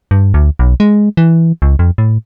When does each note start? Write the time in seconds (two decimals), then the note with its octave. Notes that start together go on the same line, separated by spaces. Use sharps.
0.11 G2
0.34 D2
0.59 B1
0.80 G#3
1.17 E3
1.62 C#2
1.79 F2
1.98 A2